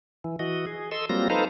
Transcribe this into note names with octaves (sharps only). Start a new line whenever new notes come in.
E3
E3 F#4 D#5
G#4
A4 D#5 C6 E6
F#3 G3 A#3 C4 F4 A#6
D#4 A4 B4 C5 F5 A#5